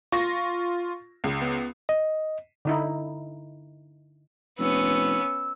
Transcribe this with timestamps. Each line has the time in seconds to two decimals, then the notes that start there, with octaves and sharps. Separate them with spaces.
0.12 F4 C#6 A#6
1.24 C#2
1.42 B3
1.89 D#5
2.65 D3 D#4 E4
4.59 F1 B3 C#4 E6